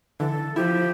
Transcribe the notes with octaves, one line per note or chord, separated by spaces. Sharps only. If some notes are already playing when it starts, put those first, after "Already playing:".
D3 E3 A4
F3 E4 G4